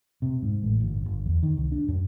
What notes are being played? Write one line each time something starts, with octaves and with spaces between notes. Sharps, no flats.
C3
G#2
A1
G1
G1
E2
D#3
C2
D4
F#2